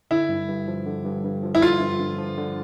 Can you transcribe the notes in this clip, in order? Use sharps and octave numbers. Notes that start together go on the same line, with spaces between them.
D3 E4
G2
G2
F3
D3
G2
G2
F3
E4
D3 F4
G2
G2
F3
D3